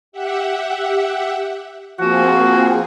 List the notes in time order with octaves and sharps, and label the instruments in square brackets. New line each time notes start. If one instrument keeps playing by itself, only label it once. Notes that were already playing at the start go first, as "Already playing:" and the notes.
[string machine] G4 E5 F#5
[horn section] F3 F#4 [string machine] A#3 C4 G#4